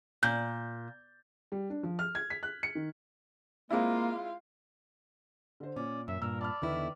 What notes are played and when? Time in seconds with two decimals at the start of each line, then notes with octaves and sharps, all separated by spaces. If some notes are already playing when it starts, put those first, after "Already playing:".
0.23 A#2 G6
1.52 G3
1.70 D4
1.83 F3
1.99 F6
2.15 G#6
2.30 B6
2.43 F#6
2.63 C#7
2.75 D#3
3.70 G#3 A#3 C4 E4 F4 F5
5.60 D3 C5
5.76 A#2 C#4 D5
6.08 F#2 E5
6.22 G2 A#2 A#4 E6
6.41 D5 A5 B5 F6
6.62 E2 D3 D#3 E4 B4